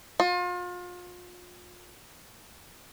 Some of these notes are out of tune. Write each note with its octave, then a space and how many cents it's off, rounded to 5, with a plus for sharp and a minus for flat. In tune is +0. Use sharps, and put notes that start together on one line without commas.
F4 +35